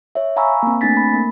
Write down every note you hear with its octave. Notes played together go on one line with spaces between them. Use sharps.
C#5 E5
F5 G#5 A#5 B5 C#6 E6
A#3 C4
A3 C4 D4 G#5 A6 B6
B5
A#3